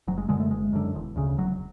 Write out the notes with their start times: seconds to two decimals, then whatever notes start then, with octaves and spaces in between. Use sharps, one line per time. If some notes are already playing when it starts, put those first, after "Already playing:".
0.07 F#1 F#3
0.18 G#3
0.29 F#2 D3 G#3
0.40 A3
0.50 F#1 G#3
0.73 F#2 D3
0.95 E1
1.16 D2 C#3
1.38 E1 F#3